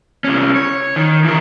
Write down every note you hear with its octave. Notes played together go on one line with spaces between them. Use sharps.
C2 C#4
C#5
D#3
E3 A#4